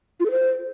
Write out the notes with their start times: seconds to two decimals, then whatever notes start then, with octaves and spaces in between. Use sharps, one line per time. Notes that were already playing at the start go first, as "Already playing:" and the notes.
0.20 F4
0.25 A4
0.31 C5